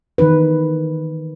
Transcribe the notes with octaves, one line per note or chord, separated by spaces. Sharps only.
D#3 E3 D#4 B4